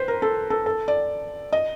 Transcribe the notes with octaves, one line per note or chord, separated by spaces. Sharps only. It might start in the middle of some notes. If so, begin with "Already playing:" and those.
Already playing: B4 C5
A#4
A4
A4
A4
D5
D#5